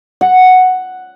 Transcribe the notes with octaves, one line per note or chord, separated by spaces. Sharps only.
F#5